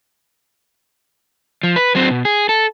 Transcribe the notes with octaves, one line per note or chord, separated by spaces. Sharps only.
F3
B4
F#3 C4
B2
G#4
A4